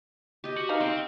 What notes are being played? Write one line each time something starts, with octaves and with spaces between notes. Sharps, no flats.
G4 D#5
F#4
D#4 F5
C4 C5 G5